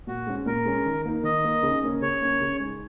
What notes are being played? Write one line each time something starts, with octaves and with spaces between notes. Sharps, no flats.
A#2 F#4
G#3 C#4
A#2 A#4
G#3 C#4
D#3
A#3 D#4
D#3 D#5
A#3 D#4
C#3
A#3 C#4
C#3 C#5
A#3 C#4
C#3
G#3 D#4